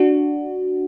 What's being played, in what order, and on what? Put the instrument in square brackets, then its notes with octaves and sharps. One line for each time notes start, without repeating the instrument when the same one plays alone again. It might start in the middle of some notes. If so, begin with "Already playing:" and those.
Already playing: [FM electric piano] D4 F#4